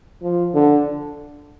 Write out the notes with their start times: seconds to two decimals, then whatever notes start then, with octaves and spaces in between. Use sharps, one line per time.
0.23 F3
0.54 D3